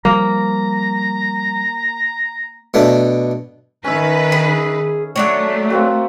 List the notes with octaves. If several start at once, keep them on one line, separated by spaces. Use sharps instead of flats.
F3 G3 A#3 A#5
B2 A3 D4
D#3 C#4 B4 E5
G#4
F#3 A3 D4 C#5
A#3 C4 F#4